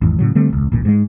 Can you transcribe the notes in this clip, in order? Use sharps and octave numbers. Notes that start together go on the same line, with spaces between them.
G#1 E2
A2 C#3 F#3
D3 G3 A3 C4
E1 C#2
D#1 A1 A#2
G#2 G#3